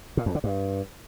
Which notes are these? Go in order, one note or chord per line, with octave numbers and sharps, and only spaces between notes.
A#2
F2
D3
G2